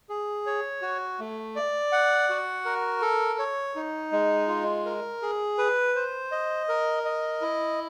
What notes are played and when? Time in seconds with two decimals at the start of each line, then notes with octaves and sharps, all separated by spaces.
0.09 G#4
0.46 C#5
0.82 F#4
1.20 A3
1.56 D5
1.92 F#5
2.29 F#4
2.65 A#4
3.01 A4
3.39 C#5
3.76 D#4
4.12 G#3
4.48 F4
4.86 A#4
5.22 G#4
5.58 B4
5.95 C5
6.32 D#5
6.69 A#4
7.05 D#5
7.41 E4